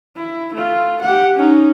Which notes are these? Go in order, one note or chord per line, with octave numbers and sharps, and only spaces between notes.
E4
A3 F4
G4 F#5
C#4 D#4